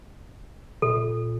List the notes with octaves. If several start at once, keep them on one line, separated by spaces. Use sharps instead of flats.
A#2 A4